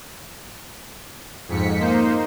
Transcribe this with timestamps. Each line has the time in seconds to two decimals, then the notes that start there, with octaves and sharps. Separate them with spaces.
1.48 F2 G#2 B6 C#7
1.80 A#3 D#4 C5